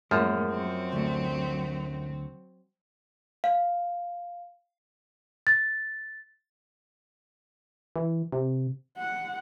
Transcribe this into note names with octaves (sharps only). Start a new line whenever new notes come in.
F#2 A2 F3 G#3 A#3
F#3 C4
D2 A3
F5
A6
E3
C3
F#5